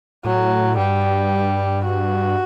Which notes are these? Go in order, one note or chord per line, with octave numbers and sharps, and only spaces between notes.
A2 F#3
G2 G3
F#4